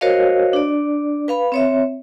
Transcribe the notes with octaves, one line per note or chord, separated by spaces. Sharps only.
F#4 A#4 C5 C#5 D#5 F5
D4 D5
B4 F5 B5
C4 C#5 E5